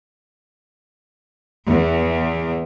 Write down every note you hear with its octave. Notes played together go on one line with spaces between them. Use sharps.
E2